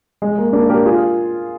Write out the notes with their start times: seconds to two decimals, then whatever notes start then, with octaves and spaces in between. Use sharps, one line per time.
0.22 G#3
0.38 A#3
0.53 A#3 D4
0.69 G4 A#4
0.85 F4 G#4